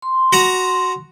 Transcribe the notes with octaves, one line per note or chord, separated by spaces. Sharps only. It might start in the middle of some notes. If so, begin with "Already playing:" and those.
C6
F#4 F#5 A#5